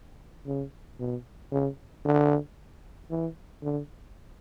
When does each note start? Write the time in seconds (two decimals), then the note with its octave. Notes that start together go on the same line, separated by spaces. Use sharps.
0.46 C#3
1.00 B2
1.52 C#3
2.05 D3
3.11 E3
3.63 D3